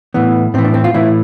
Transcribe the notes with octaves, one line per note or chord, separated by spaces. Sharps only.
A2 E3 B3
A2 E3 C4
D4
C4
F4
A2 E3 E4